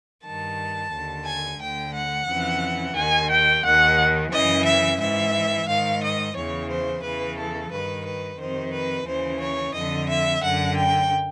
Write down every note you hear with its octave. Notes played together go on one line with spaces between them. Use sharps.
G2 D#3 A5
D#2 D3
G#5
D2 D3 G5
F#5
F2 C#3 E3
D#2 D#3 G#5
G5
D#2 D#3 F#5
F#2 C#3 E3 D#5
E5
G#2 E3 E5
G#2 D#3 F5
D#5
E2 C#3 E3 C#5
C5
E2 C#3 E3 B4
A4
G2 D#3 B4
B4
F2 C3 D#3 C5
B4
D#2 C#3 E3 C5
C#5
F2 D3 D#5
E5
F#2 D3 F#5
G5